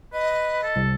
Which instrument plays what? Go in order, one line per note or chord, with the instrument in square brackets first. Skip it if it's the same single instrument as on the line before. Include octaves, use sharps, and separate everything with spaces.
[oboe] B4 [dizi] D#5
[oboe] A4
[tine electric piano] C2